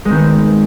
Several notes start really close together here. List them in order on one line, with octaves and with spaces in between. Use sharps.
G#3 C4 D#3 B3